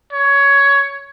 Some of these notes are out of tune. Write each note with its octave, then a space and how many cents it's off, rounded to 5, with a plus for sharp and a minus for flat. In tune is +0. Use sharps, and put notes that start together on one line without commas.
C#5 +15